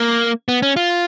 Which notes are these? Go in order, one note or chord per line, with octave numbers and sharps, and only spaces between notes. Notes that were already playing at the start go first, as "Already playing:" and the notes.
Already playing: A#3
B3
C#4
F4